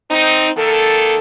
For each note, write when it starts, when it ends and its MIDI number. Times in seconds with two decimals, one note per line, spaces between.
0.11 0.48 60
0.11 0.48 63
0.57 1.18 51
0.57 1.18 58
0.57 1.18 69